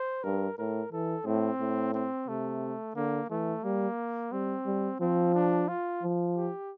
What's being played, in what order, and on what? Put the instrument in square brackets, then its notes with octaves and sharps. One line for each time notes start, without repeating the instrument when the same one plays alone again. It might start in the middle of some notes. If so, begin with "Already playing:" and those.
Already playing: [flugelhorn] C5
[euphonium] G2 [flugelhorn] A#4
[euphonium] A2 [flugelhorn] A#4
[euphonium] E3 [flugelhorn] A4
[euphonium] A2 [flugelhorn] C4
[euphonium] A2
[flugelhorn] C4
[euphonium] C3 [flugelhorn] A3
[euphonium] D3 [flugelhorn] A#3
[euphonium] E3 [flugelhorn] A3
[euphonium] G3 [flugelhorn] A#3
[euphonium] G3 [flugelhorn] C4
[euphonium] G3
[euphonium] F3 [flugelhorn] C4
[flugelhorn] D4
F4
[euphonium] F3
[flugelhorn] G4